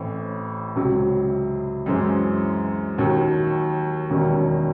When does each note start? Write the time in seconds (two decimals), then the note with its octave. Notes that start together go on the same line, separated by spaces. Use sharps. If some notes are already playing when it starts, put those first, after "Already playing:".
Already playing: A1 A2 E3 C4
0.75 C#2 C3 F#3
1.86 F#2 E3 G#3 C4
2.98 D#2 D#3 F#3
4.10 E1 D#2 D#3 F#3 C#4